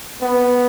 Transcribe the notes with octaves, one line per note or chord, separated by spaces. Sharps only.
B3